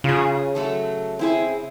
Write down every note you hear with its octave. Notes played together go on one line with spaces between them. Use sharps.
C#3 F4 G#4
F#3 A3 A4
C4 E4 G#4